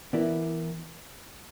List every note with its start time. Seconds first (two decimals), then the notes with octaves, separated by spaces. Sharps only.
0.13 E3 B3 E4 A#4 D5